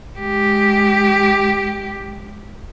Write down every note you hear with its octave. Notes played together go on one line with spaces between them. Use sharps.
G#3 G4